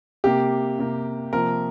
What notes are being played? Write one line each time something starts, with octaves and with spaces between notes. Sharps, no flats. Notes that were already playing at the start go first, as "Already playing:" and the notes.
C3 A#3 G4
C3 A#3
C3 F3 A#3 A#4